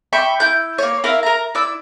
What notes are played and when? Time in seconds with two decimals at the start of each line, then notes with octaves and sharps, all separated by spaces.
0.13 E5 G5 B5 C#6
0.40 E4 G6
0.78 A#3 C#5
1.04 E4 A#4 E5 F5
1.23 A#4 A#5
1.55 E4 D5 E6